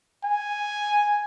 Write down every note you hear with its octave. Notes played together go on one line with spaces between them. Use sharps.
G#5